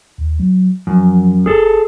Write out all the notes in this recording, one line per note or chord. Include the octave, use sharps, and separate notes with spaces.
D#2
F#3
F#2 F3
F#1 G#4 A4